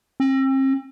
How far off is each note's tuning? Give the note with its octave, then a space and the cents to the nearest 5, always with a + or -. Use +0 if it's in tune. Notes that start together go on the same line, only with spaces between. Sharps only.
C4 +40